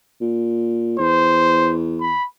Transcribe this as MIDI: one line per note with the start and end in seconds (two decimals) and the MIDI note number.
0.21 0.97 46
0.99 2.16 40
0.99 1.75 72
2.01 2.25 83